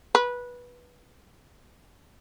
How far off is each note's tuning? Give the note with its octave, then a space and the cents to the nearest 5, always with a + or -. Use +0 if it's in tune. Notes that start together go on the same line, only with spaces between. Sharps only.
B4 -15